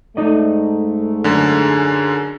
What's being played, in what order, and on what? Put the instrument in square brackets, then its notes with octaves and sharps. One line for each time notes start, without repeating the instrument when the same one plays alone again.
[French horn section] G#2 A3 [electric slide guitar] D#4 D5 D#5
[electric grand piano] F#2 D3 [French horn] G#4